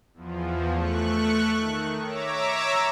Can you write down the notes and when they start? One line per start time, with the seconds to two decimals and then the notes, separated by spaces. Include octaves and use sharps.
0.14 E2 F3
0.74 A3 C#6 F#6
1.58 D#3
2.04 C#5 E5 A#5 D6 E6